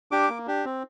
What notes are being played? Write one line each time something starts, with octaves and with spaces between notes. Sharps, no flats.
D4 G4 D6
A#3
D4 G4
C4